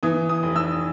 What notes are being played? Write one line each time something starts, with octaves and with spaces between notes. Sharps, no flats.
E3 D#6
D#6
F1
E6